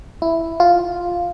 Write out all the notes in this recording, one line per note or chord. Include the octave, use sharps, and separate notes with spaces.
E4
F4